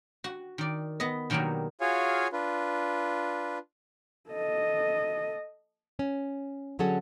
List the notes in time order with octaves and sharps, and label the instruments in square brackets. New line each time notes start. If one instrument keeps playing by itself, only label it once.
[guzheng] F#4
D#3 D5
B3 D#5
B2 D#3 F#3 G3 A#3 F#4
[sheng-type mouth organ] F4 F#4 G#4 C#5 F5 G#5
D4 F4 B4
[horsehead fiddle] A4 D#5
[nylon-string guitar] C#4
D3 F#3 C#4 G#4 A4 F#5